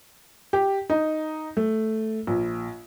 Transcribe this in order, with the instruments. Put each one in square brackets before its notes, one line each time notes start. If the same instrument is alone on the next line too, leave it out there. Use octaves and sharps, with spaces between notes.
[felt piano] G4
D#4
A3
A#1